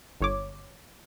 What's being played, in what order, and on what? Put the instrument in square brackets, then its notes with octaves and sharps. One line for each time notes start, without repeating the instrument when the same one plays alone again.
[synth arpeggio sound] G1 C#5 D6